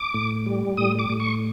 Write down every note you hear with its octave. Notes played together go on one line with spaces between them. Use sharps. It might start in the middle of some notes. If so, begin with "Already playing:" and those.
Already playing: D6
A2
G3
A2 D#6
D6
A2
C#6